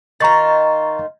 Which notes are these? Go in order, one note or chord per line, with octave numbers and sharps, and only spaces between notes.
D#3 F4 A#5 C#6 A6